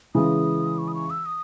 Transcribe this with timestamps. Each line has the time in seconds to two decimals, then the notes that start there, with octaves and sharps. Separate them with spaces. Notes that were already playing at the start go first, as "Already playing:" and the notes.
0.15 C#3 E3 G#3 D#6
0.78 C#6
0.88 D#6
0.95 C#6
1.10 E6
1.26 D#6